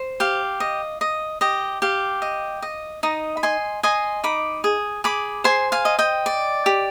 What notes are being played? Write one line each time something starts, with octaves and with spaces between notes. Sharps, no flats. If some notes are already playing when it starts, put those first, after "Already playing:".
Already playing: C5
G4 F5
D#5
D#5
G4 D#5
G4 F5
D#5
D#5
D#4 D#5
B5
D#5 G#5 C6
D#5 G#5 C6
D#4 B5 D6
G#4
G#4 B5 D6
C5 G#5 C6
F5 G#5
D#5
D#5 G5
D5
G4